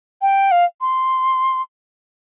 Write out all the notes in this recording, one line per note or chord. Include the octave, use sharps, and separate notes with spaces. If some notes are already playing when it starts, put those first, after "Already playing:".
G5
F5
C6